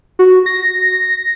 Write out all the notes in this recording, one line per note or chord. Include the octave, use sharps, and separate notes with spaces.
F#4
A#6